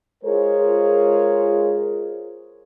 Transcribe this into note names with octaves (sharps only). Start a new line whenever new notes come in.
G#3 F4 G#4 A#4 C5 C#5